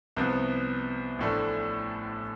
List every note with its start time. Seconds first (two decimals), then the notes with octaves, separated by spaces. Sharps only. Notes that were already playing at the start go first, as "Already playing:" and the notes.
0.17 C2 C3 F3 B3
1.19 A1 A2 F3 A3 D4